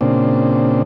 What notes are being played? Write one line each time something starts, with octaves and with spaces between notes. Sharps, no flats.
A#2 C#3 C4 D4